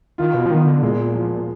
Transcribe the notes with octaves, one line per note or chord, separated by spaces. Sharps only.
D#3 F4
B2
F3
D#3 B3
D3
A#2 G#3
F3